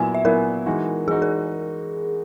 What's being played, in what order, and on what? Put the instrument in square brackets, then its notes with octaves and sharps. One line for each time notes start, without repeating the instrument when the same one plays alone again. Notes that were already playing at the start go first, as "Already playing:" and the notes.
Already playing: [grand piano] A#2 F#3 B3 E4 [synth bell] G#5
[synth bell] E5
[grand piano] A#2 F#3 B3 E4 [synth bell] A#4
[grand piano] E3 G#3 D#4 F#4
[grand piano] E3 G#3 D#4 F#4 [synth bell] G#4
[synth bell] A#4